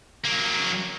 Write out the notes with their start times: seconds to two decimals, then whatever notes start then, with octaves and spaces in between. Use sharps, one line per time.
0.24 F#3 A#3